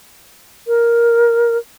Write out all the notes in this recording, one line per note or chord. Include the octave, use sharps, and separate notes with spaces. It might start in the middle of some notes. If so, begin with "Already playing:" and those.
A#4